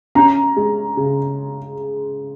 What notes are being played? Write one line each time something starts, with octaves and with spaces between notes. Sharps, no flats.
C#4 A#5
G#3
C#3